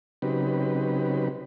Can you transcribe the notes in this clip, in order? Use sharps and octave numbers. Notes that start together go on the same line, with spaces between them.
C#3 F#3 C4 D#4 G4 B4